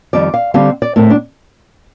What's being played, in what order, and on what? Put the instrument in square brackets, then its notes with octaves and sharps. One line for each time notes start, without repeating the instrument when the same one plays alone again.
[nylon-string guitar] F2 D#3 G3 D5
F5
D3 G3 C4 F5
D5
A2 A3 C4 A#4
D4